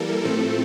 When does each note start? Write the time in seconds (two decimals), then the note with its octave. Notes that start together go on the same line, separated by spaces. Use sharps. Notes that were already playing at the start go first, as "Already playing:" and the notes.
Already playing: E3 G3 A#3 A4 A#4
0.24 A2 F3 A3 C4